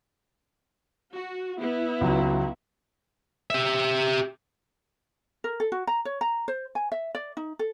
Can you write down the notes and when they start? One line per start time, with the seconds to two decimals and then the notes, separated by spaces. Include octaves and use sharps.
1.14 F#4
1.60 B3 E4
2.01 C#2 F#3
3.50 G4 E5
5.44 A#4
5.60 A4
5.72 F#4
5.87 A#5
6.05 C#5
6.21 A#5
6.48 C5
6.75 G#5
6.92 E5
7.15 D5
7.37 D#4
7.59 A4